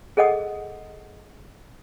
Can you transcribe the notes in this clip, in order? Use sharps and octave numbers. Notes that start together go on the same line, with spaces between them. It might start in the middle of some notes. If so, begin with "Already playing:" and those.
G#4 A4 D#5 F#5 D#6